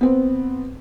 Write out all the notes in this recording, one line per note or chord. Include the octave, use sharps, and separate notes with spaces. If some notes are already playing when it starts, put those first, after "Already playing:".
B3 C4